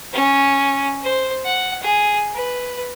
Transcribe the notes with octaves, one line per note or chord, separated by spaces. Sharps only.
C#4
C5
F#5
G#4
B4